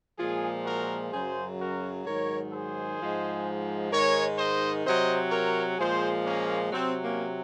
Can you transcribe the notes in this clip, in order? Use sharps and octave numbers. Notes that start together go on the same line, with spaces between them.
A#2 F3 G#3 F4 G#4
F#4 A#4
F#2 C#3 F#3 G#4 C5
F#4 A#4
G#2 D#3 F#3 A#4 C#5
G#4 C5
G#2 F3 G#3
G#2 D#3 G#3 A#4 C#5
C5 D#5
C3 F#3 C5 D#5
A#4 C#5
A#2 F3 G#3 G#4 C5
A#3 C#4
C3 F#3 C4
A#3 C#4